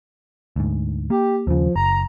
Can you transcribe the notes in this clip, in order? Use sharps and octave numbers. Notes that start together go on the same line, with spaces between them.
D2 G#2
A#3 G4
D#2 C#3 F3
F#1 A#5